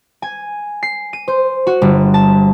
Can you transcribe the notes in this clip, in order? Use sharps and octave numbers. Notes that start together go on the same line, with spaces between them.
G#5
C7
D#7
C5
F#4
G1
A5